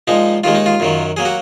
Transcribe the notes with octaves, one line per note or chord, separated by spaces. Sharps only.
A#2 F3 G#3 D#4
D#2 D#3 G#3 F4
D#4
F4
F#2 D#3 F#3
F#3 A#3 G#4
F#4